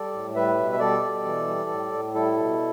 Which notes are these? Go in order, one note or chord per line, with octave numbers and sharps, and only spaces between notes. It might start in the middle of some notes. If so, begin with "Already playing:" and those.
Already playing: G3 A4 D5
A2
G3 B4 E5
B2
E5
G3 A4 D5
B2
E3
G3
A2
A2
G3 E4 A4
B2